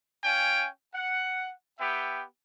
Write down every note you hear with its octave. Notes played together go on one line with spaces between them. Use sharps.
C#4 F5 G5 G#5
F#5
B3 G4 E5 G5